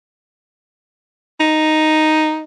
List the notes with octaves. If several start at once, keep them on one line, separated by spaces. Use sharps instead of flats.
D#4